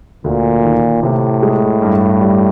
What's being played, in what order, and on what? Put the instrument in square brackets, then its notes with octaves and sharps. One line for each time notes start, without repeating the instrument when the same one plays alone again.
[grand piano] D2 [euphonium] A#2
[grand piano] D#3
[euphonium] A2 [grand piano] C3
[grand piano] G#3
G2
G3